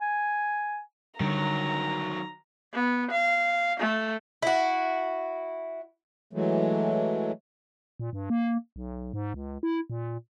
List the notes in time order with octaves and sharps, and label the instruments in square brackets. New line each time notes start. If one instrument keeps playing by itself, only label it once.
[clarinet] G#5
[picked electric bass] D3 G3 [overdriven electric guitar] D#3 F#3 [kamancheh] A#5
[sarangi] B3
F5
A3
[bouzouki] E4 F#4
[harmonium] E3 F#3 G#3 A3
[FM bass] A#2
G2
A#3
B1
G#2
C#2
E4
A#2